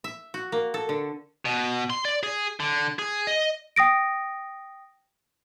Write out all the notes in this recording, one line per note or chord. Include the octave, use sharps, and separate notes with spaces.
E5
F#4
A#3
A4
D3
B2
C6
D5
G#4
D3
G#4
D#5
G5 D#6 A#6 D7